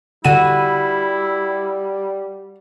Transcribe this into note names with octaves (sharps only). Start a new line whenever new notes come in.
D3 G3 E4 F#4 D#7